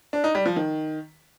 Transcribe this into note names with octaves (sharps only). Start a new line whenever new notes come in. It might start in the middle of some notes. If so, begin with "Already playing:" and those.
D4
D#4
G3
F3
D#3